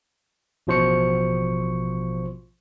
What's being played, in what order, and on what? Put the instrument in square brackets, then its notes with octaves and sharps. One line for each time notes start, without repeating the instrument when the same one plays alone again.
[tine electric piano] A1 B2 F3 C5 C#6 C#7